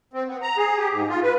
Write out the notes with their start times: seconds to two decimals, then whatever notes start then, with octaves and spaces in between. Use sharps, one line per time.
0.13 C4
0.27 B3
0.42 A#5
0.57 G#4
0.77 G4
0.92 G#2
1.08 F4
1.23 B4